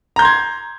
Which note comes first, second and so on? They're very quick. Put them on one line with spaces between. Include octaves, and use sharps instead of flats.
A#5 G6 C6 G#6